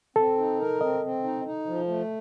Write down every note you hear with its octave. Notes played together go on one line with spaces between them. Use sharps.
C4 A4
D#4
A#4
C4 D#5
C4
D#4
D#4
F3
A3